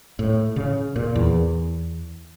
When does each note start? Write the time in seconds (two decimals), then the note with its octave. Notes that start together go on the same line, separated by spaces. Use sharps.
0.19 A2
0.56 C#3
0.96 A#2
1.15 E2